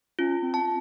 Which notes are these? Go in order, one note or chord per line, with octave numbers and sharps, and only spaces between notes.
C#4 F4
C4
A5